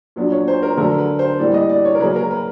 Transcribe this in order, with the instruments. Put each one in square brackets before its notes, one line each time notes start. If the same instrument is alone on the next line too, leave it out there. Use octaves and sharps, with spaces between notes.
[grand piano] A#2 F#3 B3 D4
C#5
C5
A#4
D3 F#3 A3 A#4
B4
C5
A2 E3 G3 A#3 D5
D#5
D5
C#5
A#4
C#3 F#3 A#3 C#4 B4
A#4
B4